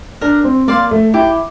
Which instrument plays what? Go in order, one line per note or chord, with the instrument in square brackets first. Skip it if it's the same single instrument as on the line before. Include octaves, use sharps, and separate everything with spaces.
[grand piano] D4 [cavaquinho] A#4
[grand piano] C4
[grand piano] A#3 [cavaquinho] D5 F5 C6
[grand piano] A3
[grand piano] E4 [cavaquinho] G4